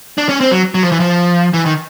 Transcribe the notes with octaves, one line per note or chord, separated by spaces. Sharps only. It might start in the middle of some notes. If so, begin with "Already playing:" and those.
D4
C#4
C4
F#3
F#3
F3
E3
F3
E3
D#3